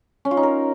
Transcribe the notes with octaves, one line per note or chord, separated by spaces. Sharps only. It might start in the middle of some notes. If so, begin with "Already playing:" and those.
C#4
F4
D#4
A#4